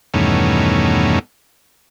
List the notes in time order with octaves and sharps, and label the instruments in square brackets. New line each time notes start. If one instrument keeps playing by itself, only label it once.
[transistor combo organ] E2 G2 B2 D#3 A3 C#4